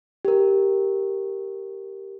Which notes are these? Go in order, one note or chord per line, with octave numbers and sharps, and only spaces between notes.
G4 A#4